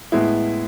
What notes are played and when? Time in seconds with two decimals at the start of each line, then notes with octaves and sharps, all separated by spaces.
0.12 A2 G#3 B3 E4